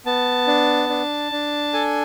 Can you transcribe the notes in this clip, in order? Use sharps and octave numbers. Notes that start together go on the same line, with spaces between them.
B3 A5
D4
D4
D4
A4 G#5